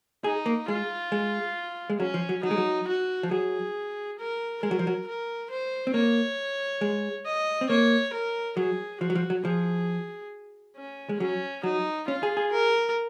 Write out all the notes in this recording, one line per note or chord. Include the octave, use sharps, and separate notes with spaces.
D#4 G#4
A#3
G#3 F4
G#3
G#3
F#3 C#4
F3
F#3
F#3 D#4
G#3
F#3
F#4
F3
F#3 G#4
A#4
G#3 A#4
F#3
F3
F#3
A#4
C5
C4
A#3 C#5
G#3
D#5
C4
A#3 C#5
A#4
F#3 G#4
F3 F#4
F#3
F3
F#3
F3 G#4
C#4
G#3
F#3 C#4
F#3 D#4
C#4 F4
G#4
G#4
A#4